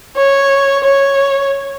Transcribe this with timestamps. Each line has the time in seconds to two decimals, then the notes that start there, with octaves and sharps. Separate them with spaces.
0.17 C#5
0.84 C#5